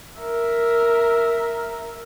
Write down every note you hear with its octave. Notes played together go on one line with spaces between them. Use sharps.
A#4 E5